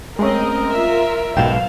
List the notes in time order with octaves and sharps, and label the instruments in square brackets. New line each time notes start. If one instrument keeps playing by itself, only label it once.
[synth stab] G#3 A3 C#4 [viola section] C4 D#5 [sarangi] A#4
[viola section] F4 E5
[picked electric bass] B1 G#2 B2 [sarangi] F5 [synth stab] G5 E7